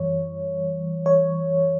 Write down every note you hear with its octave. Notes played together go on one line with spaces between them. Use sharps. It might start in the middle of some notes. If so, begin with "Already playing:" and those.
Already playing: F#2 E3 G3 C#5
C#5